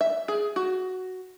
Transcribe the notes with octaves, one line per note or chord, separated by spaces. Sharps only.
E5
G#4
F#4